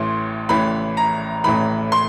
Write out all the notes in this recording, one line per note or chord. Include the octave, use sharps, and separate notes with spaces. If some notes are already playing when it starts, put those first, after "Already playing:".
Already playing: A1 A2 E3 C6
A1 A2 E3 B5
A#5
A1 A2 E3 B5
C6